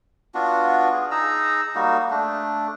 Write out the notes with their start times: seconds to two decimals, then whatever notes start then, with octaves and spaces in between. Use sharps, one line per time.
0.35 B3 D4 F4 F#4
0.93 G#4
1.11 D#4 G#4 A#5 E6
1.75 G3 A#3 D#4 F#4
2.10 A3 D4